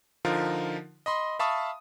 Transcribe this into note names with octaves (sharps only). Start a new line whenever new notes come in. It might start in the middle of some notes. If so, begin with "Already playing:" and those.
D3 F3 D#4 F4 A#4
D#5 B5 C6
E5 F5 A5 B5 C#6 D#6